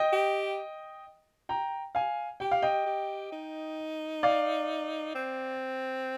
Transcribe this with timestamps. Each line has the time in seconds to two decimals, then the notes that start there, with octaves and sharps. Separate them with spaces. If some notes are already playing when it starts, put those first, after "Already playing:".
Already playing: D#5 G5
0.13 G4
1.49 G5 A#5
1.95 F5 G#5
2.40 G4 G5
2.51 F5
2.62 D#5 G5
2.86 G4
3.32 D#4
4.23 D5 F5
5.15 C4